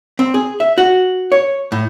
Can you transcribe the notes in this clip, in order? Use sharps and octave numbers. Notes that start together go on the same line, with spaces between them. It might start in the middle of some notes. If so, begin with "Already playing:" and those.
C4
G#4
E5
F#4
C#5
A2